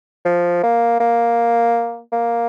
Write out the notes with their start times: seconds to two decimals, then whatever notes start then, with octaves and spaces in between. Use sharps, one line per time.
0.25 F3
0.63 A#3
1.00 A#3
2.12 A#3